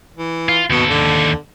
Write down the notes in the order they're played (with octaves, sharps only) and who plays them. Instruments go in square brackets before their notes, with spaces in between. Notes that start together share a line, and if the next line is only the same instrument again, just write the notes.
[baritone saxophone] E3
[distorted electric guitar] F4
[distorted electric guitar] D#2 A4 [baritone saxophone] B2
[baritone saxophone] D3